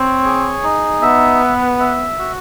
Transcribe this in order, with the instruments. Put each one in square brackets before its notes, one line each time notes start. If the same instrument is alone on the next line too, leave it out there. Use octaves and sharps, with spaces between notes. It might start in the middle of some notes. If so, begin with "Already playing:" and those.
Already playing: [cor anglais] C4 [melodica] C#5
[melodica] G#4
D#4
[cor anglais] B3 [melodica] E5
[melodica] B4
E5
F#4